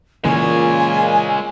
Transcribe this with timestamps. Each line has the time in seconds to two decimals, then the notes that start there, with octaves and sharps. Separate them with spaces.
0.25 A#2 C#3 E3 G#3 A#3 C#5 G#5